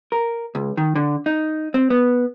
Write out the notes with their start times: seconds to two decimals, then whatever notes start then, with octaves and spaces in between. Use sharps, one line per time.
0.12 A#4
0.55 C#2
0.77 D#3
0.95 D3
1.26 D#4
1.74 C4
1.90 B3